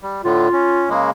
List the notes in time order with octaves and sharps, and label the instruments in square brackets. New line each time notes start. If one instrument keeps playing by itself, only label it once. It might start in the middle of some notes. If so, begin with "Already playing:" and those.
[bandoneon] G3
[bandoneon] A2 D3 [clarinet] F4
[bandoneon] C#4
C#3 G#3 A#3